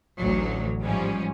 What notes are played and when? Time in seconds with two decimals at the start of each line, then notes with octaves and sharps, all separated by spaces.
0.18 A1 D2 F#3
0.82 G#2 F3 G3 C#4